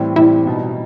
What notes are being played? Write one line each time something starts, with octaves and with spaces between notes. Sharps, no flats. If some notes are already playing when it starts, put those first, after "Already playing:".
Already playing: A2 E3 G3 C4
A2 E3 G3 C4 E4
B2 G3 D#4